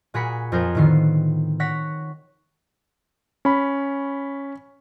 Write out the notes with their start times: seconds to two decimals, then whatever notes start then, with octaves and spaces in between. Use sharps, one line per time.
0.14 A#2 F#4 G#4 A#4 B5 C#7
0.52 F2 C4 F4 G#4 A#4 G6
0.75 A2 D3 D#3 B3 C7
1.60 C#5 F#5 A#6 B6
3.45 C#4 B5